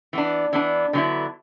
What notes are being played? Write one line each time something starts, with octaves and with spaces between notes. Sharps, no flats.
E3 B3 D4
E3 B3 D4
D3 F#3 B3 E4